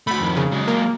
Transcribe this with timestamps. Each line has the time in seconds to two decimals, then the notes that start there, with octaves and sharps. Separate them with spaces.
0.07 A3 F#4 B5
0.20 F2 D#3
0.37 C#3
0.52 F#3 G#3
0.68 A#3